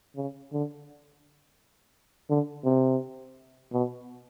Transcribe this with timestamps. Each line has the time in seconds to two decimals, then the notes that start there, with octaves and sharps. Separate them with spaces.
0.16 C#3
0.53 D3
2.30 D3
2.65 C3
3.73 B2